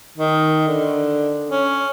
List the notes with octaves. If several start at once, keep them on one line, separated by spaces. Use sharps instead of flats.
D#3
D3
C#4